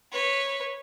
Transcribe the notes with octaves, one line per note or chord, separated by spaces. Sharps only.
B4 C#5